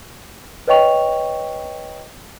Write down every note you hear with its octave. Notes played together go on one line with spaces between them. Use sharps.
B4 C#5 D#5 G5 C#6 F7